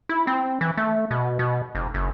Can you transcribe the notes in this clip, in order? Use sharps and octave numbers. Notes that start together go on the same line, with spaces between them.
E4
C4
E3
A3
B2
B2
F1
F#1